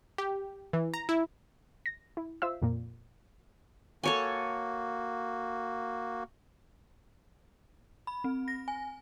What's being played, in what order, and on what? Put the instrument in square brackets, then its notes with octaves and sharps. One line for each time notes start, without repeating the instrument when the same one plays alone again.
[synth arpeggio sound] G4
E3
A#5
E4
A#6
E4
F4 C5 E5 F5 E6
F2 A#2 A#3
[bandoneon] A#3 F#4 [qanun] A4 C#5 G#5
[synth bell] B5
C4
A#6
G#5